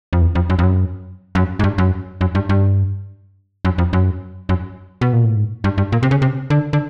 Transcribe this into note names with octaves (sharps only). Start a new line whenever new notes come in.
F2
E2
F2
F#2
F2
F#2
F#2
G#2
G2
F#2
F#2
G2
G2
F#2
F2
F#2
F#2
B2
A#2
A2
G#2
G2
G2
A#2
C3
C#3
C3
D3
D3